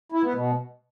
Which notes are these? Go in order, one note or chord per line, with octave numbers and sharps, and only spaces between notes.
E4
B3
B2